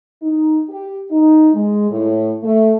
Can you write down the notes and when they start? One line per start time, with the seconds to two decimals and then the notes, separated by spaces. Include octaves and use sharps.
0.22 D#4
0.69 G4
1.10 D#4
1.54 G#3
1.91 A2
2.42 A3